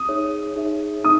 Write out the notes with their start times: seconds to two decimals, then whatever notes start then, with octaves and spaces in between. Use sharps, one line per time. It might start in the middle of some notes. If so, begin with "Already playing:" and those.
Already playing: D#6
0.08 D#4 G#4 C#5 E5
0.56 D#4 G#4 C#5 E5
1.04 D#4 D#6